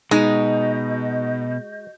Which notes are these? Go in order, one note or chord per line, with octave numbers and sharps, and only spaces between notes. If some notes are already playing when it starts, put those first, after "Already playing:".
B2 G#3 D#4 F#4 D#5 G6